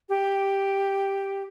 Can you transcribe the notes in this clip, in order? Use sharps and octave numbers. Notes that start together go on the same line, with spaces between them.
G4